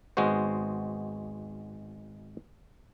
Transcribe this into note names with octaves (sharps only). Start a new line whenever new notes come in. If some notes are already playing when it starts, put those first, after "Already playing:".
G#1 G#3 B3 F#4 C5